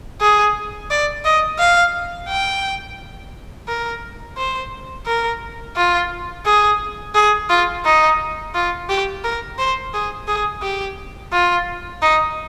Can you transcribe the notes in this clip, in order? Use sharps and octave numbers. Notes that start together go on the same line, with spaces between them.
G#4
D5
D#5
F5
G5
A#4
C5
A#4
F4
G#4
G#4
F4
D#4
F4
G4
A#4
C5
G#4
G#4
G4
F4
D#4